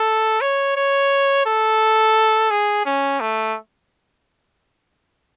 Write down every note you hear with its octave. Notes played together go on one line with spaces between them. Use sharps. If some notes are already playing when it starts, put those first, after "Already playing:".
Already playing: A4
C#5
C#5
A4
G#4
C#4
A3